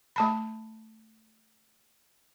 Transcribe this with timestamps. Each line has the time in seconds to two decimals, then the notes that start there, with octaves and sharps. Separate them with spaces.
0.16 A3 A5 B5